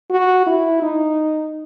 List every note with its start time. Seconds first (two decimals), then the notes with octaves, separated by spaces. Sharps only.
0.10 F#4
0.47 E4
0.82 D#4